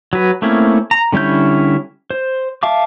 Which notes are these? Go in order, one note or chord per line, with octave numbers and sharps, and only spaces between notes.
F#3 B4
A3 A#3 C4 C#4 E4
A#5
D3 G3 C#4 E4 G6
C5
E5 F5 A5 D6